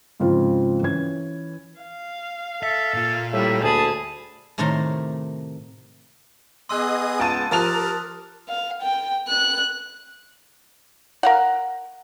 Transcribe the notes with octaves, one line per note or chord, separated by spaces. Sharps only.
G#2 C#3 F3 C4 F4
E3 C#4 G#6
F5
A4 E5
A#2 F4
A2 G3 A#3 E5
D2 G#4 A5 B5
A2 C3 D#3 A3 A#4 C6
B3 G#4 D#5 C6 D#6 E6 F#6
C#2 A5 D#7
F3 G4 A#4 A5 D#6 F6 F#6 F7
F5
G5
F#6
A#4 F5 F#5